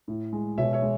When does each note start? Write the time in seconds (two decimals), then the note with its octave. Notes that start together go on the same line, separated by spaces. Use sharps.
0.08 A2
0.33 G#3
0.58 B2 C#5 E5
0.73 C#5 E5
0.82 G#3